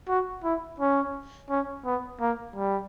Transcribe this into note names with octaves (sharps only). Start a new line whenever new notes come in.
F#4
E4
C#4
C#4
B3
A#3
G3